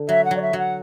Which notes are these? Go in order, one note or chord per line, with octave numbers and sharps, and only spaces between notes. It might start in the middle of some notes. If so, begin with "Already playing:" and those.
Already playing: D3
F#3 E5
F#5
F#3
D5
E5
F#3
F#5